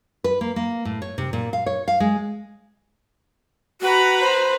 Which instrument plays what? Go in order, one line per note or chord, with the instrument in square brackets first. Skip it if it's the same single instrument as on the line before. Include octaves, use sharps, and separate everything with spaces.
[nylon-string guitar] B4
A#3
A#3
A2
C#5
C3
A#2
F5
C#5
F5
G#3
[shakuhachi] F#4 [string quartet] B4 A#5 B5
[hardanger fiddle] C5